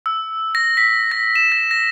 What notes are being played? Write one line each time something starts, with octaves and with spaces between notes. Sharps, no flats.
E6
A#6
B6
A#6
E7
A#6
A#6